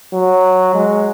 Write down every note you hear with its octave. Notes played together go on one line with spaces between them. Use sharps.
F#3
G#3